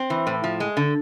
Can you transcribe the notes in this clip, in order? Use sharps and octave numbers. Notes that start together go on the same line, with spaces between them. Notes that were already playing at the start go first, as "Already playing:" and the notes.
Already playing: C4
E3
A2
F3
G#3
D3